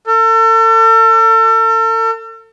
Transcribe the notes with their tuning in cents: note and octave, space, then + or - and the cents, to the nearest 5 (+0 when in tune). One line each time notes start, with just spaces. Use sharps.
A4 +40